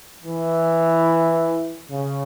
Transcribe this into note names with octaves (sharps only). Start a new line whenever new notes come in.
E3
C#3